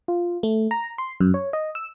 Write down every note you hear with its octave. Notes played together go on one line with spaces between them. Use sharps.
F4
A3
A#5
C6
F#2
C#5
D#5
E6